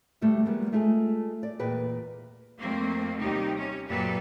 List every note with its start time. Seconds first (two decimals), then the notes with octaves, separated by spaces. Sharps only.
0.21 D2 G2 G3 A3
0.45 F3 G3 G#3 A#3 B3
0.72 G#3 A3 E4 F4 G#4 G#5
1.43 D5
1.59 E2 A#2 G#4 B4 G5
2.59 F2 A3 A#3 C4
3.18 D#2 C3 G3 D#4 G4
3.57 C#4
3.88 F#2 A#2 G4 A4 B4